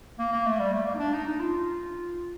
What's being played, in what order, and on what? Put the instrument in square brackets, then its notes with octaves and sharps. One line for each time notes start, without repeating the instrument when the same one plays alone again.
[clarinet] A#3
A#3
A3
G3
A3
A#3
D#4
D4
D#4
D#4
F4